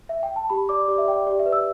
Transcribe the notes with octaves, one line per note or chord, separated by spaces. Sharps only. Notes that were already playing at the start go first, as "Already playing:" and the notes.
E5
G5
A5
G4 B5
D5 D6
G4 D5
E5
D5 G5
G4 D5
E5
B4 D5
E6